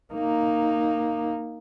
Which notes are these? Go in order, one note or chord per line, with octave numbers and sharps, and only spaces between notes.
A#3 D#4